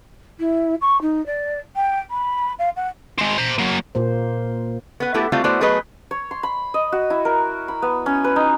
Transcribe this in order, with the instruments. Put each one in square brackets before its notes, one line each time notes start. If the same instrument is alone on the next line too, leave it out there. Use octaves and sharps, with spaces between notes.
[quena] E4
C#6
D#4
D5
G5
B5
F5
F#5
[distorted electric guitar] G#3 C4
C5 A#5
F#3 A#3
[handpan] A#2 A#3 C5
[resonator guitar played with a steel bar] B3 B4
A3 B3 E4 F#4 G4 A4
G3 A3 C4 F4 F#4
A3 B3 E4 F#4 C5 D5
F#3 A3 B3 G#4 B4 D#5
[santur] C#5
C6
B5
D#5
F#4
E4
A#4
B5
B3
C#4
B4
D#4